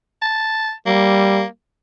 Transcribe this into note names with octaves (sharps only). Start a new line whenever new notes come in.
A5
G3 A#3